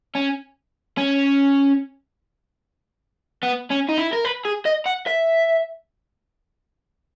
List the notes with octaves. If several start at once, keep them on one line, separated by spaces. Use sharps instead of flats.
C#4
C#4
B3
C#4
D#4
E4
A#4
B4
G#4
D#5
F#5
E5